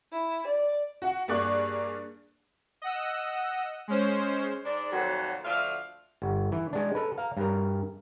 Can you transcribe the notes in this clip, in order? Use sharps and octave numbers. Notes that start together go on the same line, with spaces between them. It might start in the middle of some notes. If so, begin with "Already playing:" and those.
E4
D5
F#4 F#5
G2 A#3 G#4 D5 C#6 F#6
D#5 F#5 E6
G#3 C#4 C5
G#2 D4 D5
F2 A#2 D#3 F#3
D2 F3 D4 F#4 E5 F5
G1
E3
G#3 D4
A4 B4
F5 A#5
G2 A#4